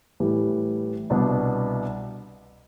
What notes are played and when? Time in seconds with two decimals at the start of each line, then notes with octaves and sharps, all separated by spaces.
0.20 A2 E3 G3
1.10 C2 B2 B3 D4